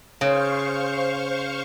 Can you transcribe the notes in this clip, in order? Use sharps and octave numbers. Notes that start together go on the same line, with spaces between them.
C#3 C5 F5 C#6